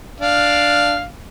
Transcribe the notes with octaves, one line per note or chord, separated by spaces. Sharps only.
D4 F5